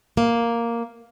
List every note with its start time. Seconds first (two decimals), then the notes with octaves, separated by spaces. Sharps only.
0.17 A#3